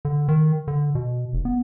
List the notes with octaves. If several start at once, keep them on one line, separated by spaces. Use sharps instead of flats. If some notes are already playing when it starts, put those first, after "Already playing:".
D3
D#3
D3
B2
F1
B3